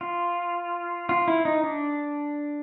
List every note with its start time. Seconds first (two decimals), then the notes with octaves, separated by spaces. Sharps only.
0.01 F4
1.09 F4
1.28 E4
1.45 D#4
1.64 D4